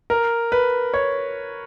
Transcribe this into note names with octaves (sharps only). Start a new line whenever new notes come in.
A#4
B4
C#5